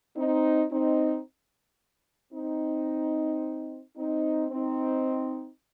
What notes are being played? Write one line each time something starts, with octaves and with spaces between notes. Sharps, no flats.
C4 D#4
C4 D#4
C4 D#4
C4 D#4
C4 D#4